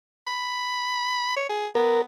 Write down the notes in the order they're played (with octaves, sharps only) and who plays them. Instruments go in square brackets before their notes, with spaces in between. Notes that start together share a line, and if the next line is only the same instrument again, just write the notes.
[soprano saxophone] B5
C#5
G#4
[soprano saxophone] B3 [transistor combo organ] A#4